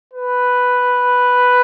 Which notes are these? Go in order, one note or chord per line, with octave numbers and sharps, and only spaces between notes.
B4